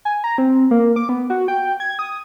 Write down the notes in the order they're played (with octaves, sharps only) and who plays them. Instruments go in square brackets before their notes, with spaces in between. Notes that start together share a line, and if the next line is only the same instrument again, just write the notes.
[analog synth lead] G#5
A#5
C4
A#3
D6
B3
F#4
G5
G#6
D#6